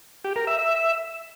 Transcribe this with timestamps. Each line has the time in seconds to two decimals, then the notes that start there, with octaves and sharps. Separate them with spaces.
0.25 G4
0.36 A#4
0.47 E5
0.59 E5